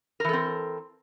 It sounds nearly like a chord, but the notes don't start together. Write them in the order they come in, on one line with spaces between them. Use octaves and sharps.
A#4 E3 A4 C4